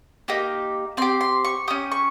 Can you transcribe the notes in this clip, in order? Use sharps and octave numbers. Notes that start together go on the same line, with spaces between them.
A#3 D#4 G4
C4 G4 C6
C6
C#6
C#4 G4 D#6
C#6